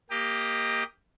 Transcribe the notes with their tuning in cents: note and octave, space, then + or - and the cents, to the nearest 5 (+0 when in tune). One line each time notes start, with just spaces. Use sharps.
A#3 +0 G4 +15 D#5 +0